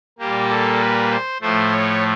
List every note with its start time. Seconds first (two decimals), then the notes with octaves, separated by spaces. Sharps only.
0.19 A#2 G3 A#3 G4
0.49 A4
0.80 B4
1.10 C5
1.41 A2 F3 A3 C5
1.72 C#5